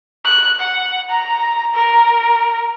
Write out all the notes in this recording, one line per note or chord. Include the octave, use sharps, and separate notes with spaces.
F#6
F#5
A#5
A#4